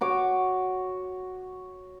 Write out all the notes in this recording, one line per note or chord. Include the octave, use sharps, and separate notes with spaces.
F#4 C#5 D6